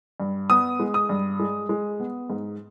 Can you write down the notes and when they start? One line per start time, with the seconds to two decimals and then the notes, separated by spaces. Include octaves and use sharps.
0.20 G2
0.50 B3 D#6
0.80 G#3
0.94 D#6
1.09 G2
1.40 G#3
1.69 G#3
2.00 B3
2.30 G#2